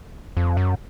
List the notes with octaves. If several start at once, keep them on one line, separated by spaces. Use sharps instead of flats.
F2
F#2